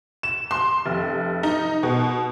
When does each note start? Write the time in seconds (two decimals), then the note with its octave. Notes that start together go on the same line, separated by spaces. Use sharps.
0.23 E7
0.51 C6
0.86 F1
1.43 D#4
1.83 B2